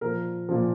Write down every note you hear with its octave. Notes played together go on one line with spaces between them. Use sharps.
A#2 F3 A#4
A#2 F3